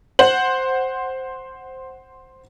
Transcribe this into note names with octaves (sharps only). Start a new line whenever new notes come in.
C5 F#5 F#7